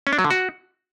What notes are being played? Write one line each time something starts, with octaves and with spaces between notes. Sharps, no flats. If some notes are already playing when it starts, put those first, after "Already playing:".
C#4
D4
F#3
D3
F#4